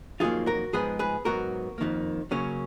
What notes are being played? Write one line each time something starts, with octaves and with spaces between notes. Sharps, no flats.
F2 D#3 F#3 A#3 F4 G#4
F#4 A#4
G#2 F3 G#3 B3 G#4 B4
G#4 B4
G#2 F#3 B3 F#4 A#4
F2 D#3 A#3
C#3 F#3 A#3 C#4